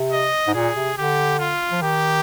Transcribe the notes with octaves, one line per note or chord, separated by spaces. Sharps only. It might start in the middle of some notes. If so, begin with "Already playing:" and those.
Already playing: C3
D#5
G#2
A#2 G#4
C3
D3 G4
F4
F3
D#3 G4